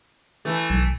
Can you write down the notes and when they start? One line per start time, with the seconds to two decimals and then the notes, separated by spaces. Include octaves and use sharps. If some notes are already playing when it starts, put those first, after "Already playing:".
0.45 E3 A3
0.70 B1